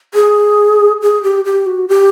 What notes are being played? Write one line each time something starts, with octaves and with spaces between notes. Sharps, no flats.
G#4
G#4
G4
G4
F#4
G4